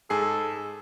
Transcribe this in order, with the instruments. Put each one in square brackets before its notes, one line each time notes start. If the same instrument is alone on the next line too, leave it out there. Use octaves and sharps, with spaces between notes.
[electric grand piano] G#2 G#4 C7 [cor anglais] A4